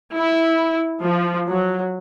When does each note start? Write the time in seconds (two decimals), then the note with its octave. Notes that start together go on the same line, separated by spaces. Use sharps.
0.12 E4
1.02 F3
1.50 F#3